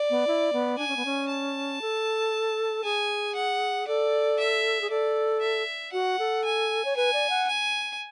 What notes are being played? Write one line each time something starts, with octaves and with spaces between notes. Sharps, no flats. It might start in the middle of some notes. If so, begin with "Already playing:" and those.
Already playing: D5
B3
E4
B3
D4 G#5
C#4
B3
C#4
A5
A4
G#4 G#5
F#5
A4 D5
E5
G#4
A4 D5
E5
F#4 F#5
A4
G#5
C#5
B4 G#5
D5
F#5
G#5